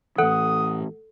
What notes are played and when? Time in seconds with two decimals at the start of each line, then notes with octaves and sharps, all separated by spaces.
0.18 A2 E3 A4 F#5 D#6